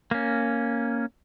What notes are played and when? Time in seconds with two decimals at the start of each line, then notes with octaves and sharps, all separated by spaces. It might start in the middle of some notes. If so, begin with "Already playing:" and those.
0.11 A#3 C#4